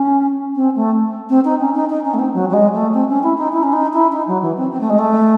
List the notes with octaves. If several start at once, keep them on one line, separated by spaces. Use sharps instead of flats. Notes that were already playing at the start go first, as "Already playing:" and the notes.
Already playing: C#4
C4
A3
C4
D#4
C#4
D#4
D#4
C#4
A3
C4
F#3
F#3
G#3
A3
C4
C#4
E4
D#4
E4
C#4
D#4
E4
D#4
F#3
E3
C4
C4
A3
G#3
A3